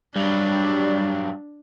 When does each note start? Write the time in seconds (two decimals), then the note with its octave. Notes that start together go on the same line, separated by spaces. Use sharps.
0.16 G2 F#3 G3 D4